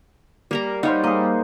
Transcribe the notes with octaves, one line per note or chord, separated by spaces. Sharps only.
G3 A#3 A#4 A#5
G3 D#4 C5 C#5 F5 F#5
A#3 G#4 D#5